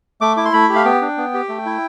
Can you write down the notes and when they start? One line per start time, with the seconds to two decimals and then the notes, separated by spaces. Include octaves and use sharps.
0.21 A3 D6
0.37 E4 D6
0.45 C6
0.53 A3 B5
0.69 G4
0.75 F5
0.84 B3 G5
1.01 D4
1.17 B3
1.34 G4
1.49 A3
1.66 E4